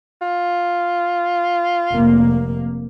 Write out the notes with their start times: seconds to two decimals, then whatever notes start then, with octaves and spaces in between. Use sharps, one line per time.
0.22 F4
1.95 F1 A#3